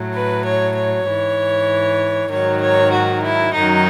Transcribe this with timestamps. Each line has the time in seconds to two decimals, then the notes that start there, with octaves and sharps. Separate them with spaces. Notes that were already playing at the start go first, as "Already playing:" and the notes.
Already playing: A2 F#3
0.15 B4
0.45 C#5
0.76 C#5
1.06 G#2 E3
2.30 G#2 D#3 F#3 C#5
2.61 C#5
2.92 F#4
3.23 E4
3.54 F#2 D#3 F#3 D#4